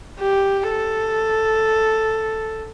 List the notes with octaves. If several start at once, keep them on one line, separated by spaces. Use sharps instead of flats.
G4
A4